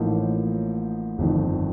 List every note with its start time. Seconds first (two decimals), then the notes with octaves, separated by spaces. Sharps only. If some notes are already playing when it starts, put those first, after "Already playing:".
Already playing: A1 A2 F3 A#3 D#4
1.18 G1 F2 D#3